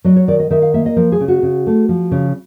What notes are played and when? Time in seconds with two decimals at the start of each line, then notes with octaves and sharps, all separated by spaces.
0.04 F#3 D#5
0.16 C#5
0.28 D#3 D5
0.40 D#5
0.50 D#3 E5
0.62 F5
0.74 A#3 E5
0.86 D#5
0.96 F3 A#4
1.12 G#4
1.20 C#3
1.28 F#4
1.43 C#3
1.67 A3
1.89 F3
2.11 C#3